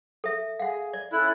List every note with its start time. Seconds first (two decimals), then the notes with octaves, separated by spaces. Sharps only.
0.24 A4 E5
0.60 G#4 F5 F#5
0.94 D5
1.12 C#4 E4 A4 F#6